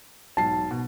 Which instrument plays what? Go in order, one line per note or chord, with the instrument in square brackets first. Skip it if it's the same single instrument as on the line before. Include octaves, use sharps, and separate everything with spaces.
[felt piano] B1 G#2 C7 [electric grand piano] A5
[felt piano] B2